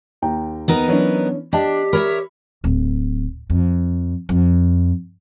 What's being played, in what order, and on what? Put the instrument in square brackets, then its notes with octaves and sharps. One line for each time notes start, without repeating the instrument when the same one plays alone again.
[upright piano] D#2 G5 A#5
[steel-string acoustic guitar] B3 D#4 A#4
[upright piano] E3 C#4 D4 [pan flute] F#3
[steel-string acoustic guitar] D4 [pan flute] G4 [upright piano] D#5 G5 A5
[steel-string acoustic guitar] A#4 C#5 E5 [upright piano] B5
[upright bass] D1
F2
F2